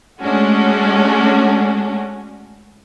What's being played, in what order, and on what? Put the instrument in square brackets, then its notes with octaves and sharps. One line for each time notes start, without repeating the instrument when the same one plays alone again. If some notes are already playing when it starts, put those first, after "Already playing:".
[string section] G#3 A3 C#4 D4 F#4